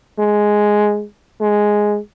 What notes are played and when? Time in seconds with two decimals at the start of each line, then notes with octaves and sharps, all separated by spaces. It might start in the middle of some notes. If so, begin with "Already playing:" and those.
0.19 G#3
1.41 G#3